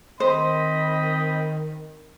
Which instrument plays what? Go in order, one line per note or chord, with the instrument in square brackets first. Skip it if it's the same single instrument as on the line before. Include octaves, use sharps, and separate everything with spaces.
[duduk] D#3 [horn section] C4 D#5 B5 [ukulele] C5